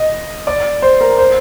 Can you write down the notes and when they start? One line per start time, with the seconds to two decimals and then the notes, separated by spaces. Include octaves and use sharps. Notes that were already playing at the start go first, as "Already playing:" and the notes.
Already playing: D#5
0.47 D5
0.82 C5
1.00 A#4
1.18 C5